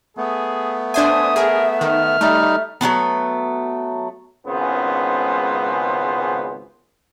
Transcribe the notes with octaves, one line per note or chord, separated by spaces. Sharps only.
A3 B3 G#4
D4 C5 E5 G#5 D#6
G#4 A#4
D#3 F6
G3 A3 D#4
F#3 G#3 A3 B3
G#1 C#2 C#3 B3 C5